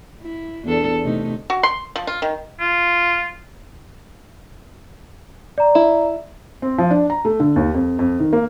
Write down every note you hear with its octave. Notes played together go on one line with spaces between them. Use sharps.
E4
E2 D4 A4
C3 A3 D#4
F#4
C6
F3
F4
D#3
F4
D5 A#5
E4
C4
F3
D4
A#5
A3
D3
D#2
F2
F2
D#3
A#3